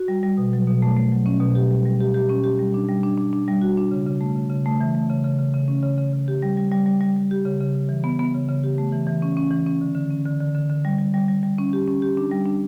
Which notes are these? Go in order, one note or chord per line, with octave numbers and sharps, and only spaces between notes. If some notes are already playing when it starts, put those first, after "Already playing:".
Already playing: F#4
G3
G3
B2
F#3
B2
A3
A3
F#3
C#4
B2
G4
G3
G3
G4
G4
C#4
G4
G3
D4
G3
D4
D4
D4
G3
F#4
D4
C#3
C#3
A3
C#3
C#3
A3
E3
A3
C#3
C#3
C#3
C#3
C#4
C#3
C#3
C#3
G4
G3
G3
G3
G3
G3
G3
G4
C#3
C#3
C#3
E3
B3
B3
C#3
C#3
G4
A3
E3
E3
C#4
C#4
E3
C#4
D3
D3
C#4
D3
D3
D3
D3
G3
G3
G3
G3
G3
C#4
G4
C#4
G4
D4
G3
D4